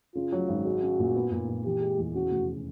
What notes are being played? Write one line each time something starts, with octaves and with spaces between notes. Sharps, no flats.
C#3 F4
F#3
G#1
G#3 F#4
C#4
A#2
B3
A#2
A#2
E3 G4
G#3
E2
C#3 F#4
F1